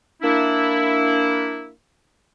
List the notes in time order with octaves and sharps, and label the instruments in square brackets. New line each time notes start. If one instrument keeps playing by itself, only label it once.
[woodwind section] A#3 D4 E4